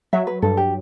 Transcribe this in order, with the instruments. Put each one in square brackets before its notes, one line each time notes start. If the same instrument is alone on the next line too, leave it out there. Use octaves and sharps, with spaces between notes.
[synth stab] F#3 [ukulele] E5
[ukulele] B4
[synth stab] G2 [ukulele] A4
[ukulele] G4